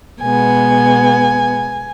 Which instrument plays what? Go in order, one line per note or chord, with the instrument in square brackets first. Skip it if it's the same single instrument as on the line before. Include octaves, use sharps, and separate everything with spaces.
[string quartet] B2 G#3 B3 G#5